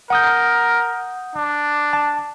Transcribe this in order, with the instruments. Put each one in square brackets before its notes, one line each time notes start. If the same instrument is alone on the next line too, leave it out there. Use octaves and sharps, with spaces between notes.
[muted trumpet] A#4 [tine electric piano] F#5 D#6 G6
[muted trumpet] D4
[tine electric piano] A5